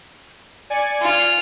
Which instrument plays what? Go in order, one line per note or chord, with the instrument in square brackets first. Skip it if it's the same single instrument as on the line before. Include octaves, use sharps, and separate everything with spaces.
[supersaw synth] D5 G#5 C#7
[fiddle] F4